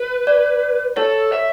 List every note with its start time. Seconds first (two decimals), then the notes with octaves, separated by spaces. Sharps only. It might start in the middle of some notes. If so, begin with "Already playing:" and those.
Already playing: B4
0.27 D5
0.97 A4 C#5
1.33 E5